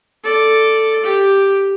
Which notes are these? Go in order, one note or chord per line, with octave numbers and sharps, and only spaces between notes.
A4 D5
G4